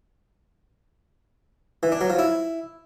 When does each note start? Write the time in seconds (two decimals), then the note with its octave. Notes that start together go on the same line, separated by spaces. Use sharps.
1.83 E3
1.92 D4
2.01 F#3
2.10 F3
2.19 E4